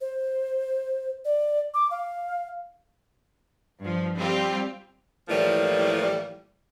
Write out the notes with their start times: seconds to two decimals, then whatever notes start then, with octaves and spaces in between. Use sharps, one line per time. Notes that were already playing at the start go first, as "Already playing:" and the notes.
0.01 C5
1.25 D5
1.74 D6
1.91 F5
3.81 G2 F3
4.17 G3 C4 F4 G4
5.28 A2 E3 F3 G3 A#3